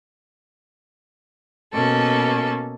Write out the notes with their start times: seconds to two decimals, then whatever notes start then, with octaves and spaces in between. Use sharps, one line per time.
1.73 B2 A#3 C#4 A4